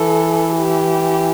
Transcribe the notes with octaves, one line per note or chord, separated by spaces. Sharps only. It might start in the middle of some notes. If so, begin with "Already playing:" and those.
Already playing: E3 A4
G4